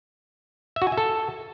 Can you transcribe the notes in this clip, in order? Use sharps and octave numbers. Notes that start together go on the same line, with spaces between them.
E5
F#4
G#5
E5
A4